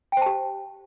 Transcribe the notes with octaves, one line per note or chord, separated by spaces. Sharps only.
G4 C5 G5 A5